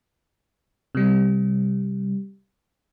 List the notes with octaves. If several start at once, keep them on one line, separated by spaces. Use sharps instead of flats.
C3 G3